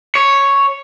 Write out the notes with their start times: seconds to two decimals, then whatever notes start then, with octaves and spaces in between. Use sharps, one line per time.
0.15 C#5